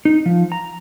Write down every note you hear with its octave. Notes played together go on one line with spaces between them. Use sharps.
D#4
F3
A#5